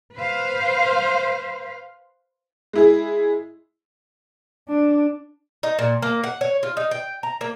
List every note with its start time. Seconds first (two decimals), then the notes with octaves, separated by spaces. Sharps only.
0.16 B4 C5 F5
2.73 G#3 E4 G#4
4.68 D4
5.63 D#4
5.79 A#2
6.02 A#3
6.24 F#5
6.41 C#5
6.63 F4
6.77 D#4
6.91 G5
7.23 A#5
7.41 A#3